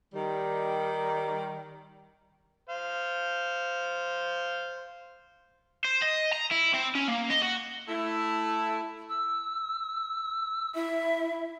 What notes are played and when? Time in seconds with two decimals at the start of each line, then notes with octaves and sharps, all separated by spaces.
0.13 D#3 G3
2.70 C5 F5
5.84 C5
6.02 D#5
6.33 A#5
6.51 E4
6.74 C4
6.95 C#4
7.08 A#3
7.30 D#5
7.42 F#4
7.88 A3 E4
9.09 E6
10.75 E4 E5